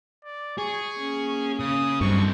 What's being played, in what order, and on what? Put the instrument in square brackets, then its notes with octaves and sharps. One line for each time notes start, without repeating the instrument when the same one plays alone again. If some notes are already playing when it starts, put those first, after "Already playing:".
[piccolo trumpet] D5
[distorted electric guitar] G#4 [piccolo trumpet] C#6
[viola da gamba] A#3 C#4
[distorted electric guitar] C#3 [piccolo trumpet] D#6
[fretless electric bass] G2 [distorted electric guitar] F#3 C4 [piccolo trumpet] C#6